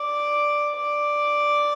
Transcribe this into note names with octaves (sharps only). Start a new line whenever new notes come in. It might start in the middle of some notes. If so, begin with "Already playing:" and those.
Already playing: D5
D5